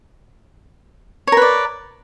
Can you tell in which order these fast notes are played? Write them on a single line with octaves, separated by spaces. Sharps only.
C#5 A#4 B4 D5